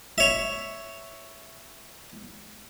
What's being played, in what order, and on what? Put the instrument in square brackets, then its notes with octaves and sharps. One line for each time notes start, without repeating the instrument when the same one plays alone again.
[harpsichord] C#5 E5